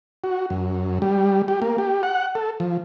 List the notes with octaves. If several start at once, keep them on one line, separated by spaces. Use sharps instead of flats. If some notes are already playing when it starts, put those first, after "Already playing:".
F#4
F#2
G3
G4
A#3
G4
F#5
A4
F3